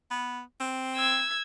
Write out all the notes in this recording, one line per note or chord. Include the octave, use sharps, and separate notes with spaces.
B3
C4
E6 G#6